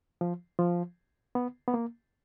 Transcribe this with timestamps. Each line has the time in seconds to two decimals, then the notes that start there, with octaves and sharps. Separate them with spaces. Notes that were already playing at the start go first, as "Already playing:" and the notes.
0.21 F3
0.59 F3
1.35 B3
1.68 B3
1.74 A#3